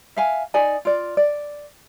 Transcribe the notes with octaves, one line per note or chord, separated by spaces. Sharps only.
E5 F5 G#5
D#4 D5 G#5
F4 D5
D5